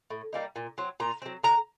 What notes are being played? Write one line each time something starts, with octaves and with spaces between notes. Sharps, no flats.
A2
G3 A#3 D#4
A#2
F#3 C4
A#2 A#5
F#3 C4
D3 A#5